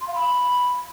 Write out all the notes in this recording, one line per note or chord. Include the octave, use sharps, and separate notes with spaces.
C6
F5
B5